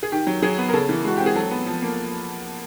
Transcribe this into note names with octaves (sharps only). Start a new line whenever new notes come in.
G#4
D#3 G4
F#3
F#3 G#4
B3
A#4
C#3 A4
E3
G#3 F#4
C4 G4
G#4
F#3 A4
B3
F3
A#3